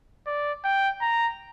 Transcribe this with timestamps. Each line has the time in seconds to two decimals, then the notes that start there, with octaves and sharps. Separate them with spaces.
0.26 D5
0.64 G5
1.01 A#5